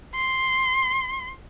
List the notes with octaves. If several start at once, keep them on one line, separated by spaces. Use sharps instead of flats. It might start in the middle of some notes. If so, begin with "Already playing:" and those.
C6